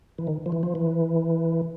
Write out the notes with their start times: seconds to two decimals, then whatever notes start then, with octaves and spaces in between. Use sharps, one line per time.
0.18 E3
0.27 D#3
0.46 F3
0.52 E3
0.63 F3
0.75 E3